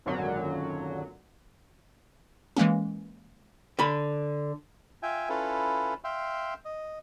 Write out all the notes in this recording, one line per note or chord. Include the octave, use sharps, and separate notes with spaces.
G#1 F#2 A#2 D3 F#3
E3 G#3 A#3 C#4
D3 B5
F4 E5 G5 G#5
C#4 E4 F4 A4 B4
E5 F5 G5 C6
D#5